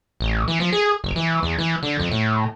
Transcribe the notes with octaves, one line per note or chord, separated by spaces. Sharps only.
A1
E3
F3
G#4
F#1
E3
E2
E3
D3
F2
A2